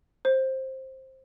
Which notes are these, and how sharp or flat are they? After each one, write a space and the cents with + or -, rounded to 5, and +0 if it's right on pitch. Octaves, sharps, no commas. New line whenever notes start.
C5 +15